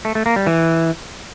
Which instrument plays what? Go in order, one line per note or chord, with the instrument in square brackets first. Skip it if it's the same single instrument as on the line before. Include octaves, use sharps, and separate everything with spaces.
[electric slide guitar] A3
A3
A#3
G3
E3